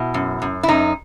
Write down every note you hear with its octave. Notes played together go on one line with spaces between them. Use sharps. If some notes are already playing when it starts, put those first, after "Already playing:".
Already playing: B2 E4
F#2
F#2
E4
F#2 D#4